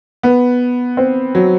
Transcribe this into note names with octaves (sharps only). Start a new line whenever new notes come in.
B3
C4
F#3